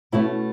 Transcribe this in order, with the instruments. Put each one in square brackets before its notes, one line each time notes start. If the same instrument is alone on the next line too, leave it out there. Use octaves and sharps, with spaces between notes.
[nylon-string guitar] B2 A3 C#4 E4